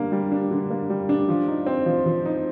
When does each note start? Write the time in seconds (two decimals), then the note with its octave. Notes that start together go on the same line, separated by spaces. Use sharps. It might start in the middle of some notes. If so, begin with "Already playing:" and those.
Already playing: D3 G3 A#3 D4
0.12 G3
0.32 D4
0.51 D3
0.70 A#3
0.90 G3
1.09 D4
1.29 F3
1.48 D#4
1.66 C4
1.86 F3
2.06 F3
2.25 D#4